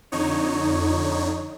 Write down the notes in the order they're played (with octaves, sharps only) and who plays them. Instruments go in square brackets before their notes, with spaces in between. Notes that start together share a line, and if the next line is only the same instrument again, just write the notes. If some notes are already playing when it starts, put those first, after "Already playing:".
[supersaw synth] F2 D3 D#4 C#5